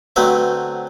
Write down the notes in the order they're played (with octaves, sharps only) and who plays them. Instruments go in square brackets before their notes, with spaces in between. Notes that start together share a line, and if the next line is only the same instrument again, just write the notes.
[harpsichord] D3 F#3 A3 C4 B4 C5